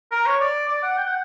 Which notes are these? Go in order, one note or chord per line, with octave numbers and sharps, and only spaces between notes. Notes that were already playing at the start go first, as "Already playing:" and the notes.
A#4
C#5
D5
D5
F#5
G5
F#5